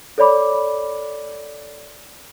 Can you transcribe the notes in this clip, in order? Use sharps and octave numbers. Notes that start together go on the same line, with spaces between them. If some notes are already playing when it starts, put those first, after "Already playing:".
A4 C#5 D5 B5 D6